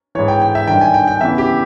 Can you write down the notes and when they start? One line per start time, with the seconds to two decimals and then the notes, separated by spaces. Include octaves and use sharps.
0.15 G#2 E3 C#5
0.28 G5
0.42 G5
0.55 E5
0.67 G2 D#3 G5
0.81 G#5
0.94 G5
1.07 G5
1.21 E2 C#3 E3 E5
1.38 G4